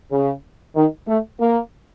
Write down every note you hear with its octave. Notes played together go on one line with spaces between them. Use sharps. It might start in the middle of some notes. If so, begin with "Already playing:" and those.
C#3
D#3
A3
A#3